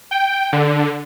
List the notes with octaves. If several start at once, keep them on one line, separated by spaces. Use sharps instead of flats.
G5
D3